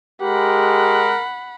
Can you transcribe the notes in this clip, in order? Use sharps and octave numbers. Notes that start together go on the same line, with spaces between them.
G#3 G4 A#4 F#5 B5